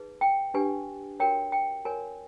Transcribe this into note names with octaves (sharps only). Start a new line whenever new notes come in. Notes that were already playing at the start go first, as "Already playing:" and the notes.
Already playing: D#4 G#4 B4
G5
D4 G4 B4 G#5
F#4 A#4 C#5 G5
G5
F#4 A#4 C#5 G#5